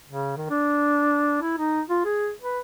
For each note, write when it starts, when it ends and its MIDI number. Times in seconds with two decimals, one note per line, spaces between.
0.09 0.35 49
0.37 0.48 51
0.50 1.40 62
1.42 1.57 64
1.58 1.81 63
1.89 2.01 65
2.05 2.31 68
2.41 2.60 71